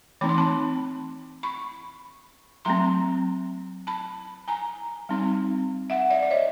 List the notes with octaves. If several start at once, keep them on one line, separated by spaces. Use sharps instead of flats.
E3 A3 C4 D#4 B5
C6
A5 B5
B5 C#6
F#3 A3 C4 A#5 C6
A5 B5
G#5 A#5
G3 C4 D#4
E5 F#5
D5 E5
D5
C#5 D#5